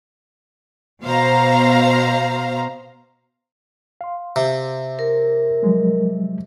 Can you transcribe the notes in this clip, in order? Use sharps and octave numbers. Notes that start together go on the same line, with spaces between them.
B2 C5 F5 A#5
F5 C6
C3
A#4
F3 F#3 G#3